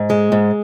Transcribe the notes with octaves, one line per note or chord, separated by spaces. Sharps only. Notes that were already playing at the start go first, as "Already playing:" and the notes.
Already playing: G#2
G#3
G#2